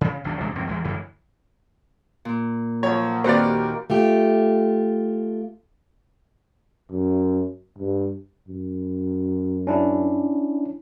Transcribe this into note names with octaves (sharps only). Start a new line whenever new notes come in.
C#3
G#1 E2 F#3 D4
E2 C3 G#3 D4
C#2 F#2 E3 C4
E2 E3 G#3
A1 F#2 D3 E3
A#2
F3 F#3 C#5
D#2 C4 F#4 G4 A#4 B4 D5 F5
A3 F4 G4
F#2
G2
F#2
C#4 D4 E4